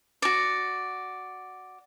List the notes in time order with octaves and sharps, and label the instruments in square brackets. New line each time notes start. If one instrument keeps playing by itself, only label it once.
[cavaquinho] F#4 D5